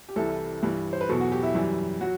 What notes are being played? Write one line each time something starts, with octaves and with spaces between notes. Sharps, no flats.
G4
C2 C3 E3 G3 A4
G2 E3 G3
C5
B4
E2 B2 F#3 A4
F#4
G4
E4
F#2 E3 G3
F#3 F#4